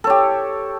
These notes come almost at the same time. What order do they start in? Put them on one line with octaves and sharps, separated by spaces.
A4 C#5 G4